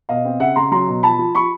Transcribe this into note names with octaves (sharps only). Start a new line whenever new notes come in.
B2 D#5 F5
C4
C#3 E5 F#5
C#3 A#5 C6
F#3 A#5 C6
B2
F3 A5 B5
F3
F3 B5 C#6